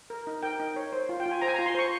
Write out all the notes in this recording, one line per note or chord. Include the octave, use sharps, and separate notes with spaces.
A#4
D#4
A#4 G5
D#4
C#5
C5
F4
G5
F4
G#5
C5 A#5
G#5
A#5
F4
C6
C5 C#6